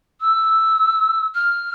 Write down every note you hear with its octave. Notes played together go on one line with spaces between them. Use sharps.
E6
F6